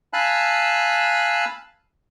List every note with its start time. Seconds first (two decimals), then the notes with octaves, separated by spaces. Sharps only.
0.13 F5 G#5 A5 B5 E6 F#6